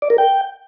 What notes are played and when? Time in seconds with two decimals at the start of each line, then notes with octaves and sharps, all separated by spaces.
0.02 D5
0.10 A#4
0.18 G5